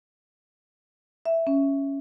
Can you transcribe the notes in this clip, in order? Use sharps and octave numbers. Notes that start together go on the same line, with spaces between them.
E5
C#4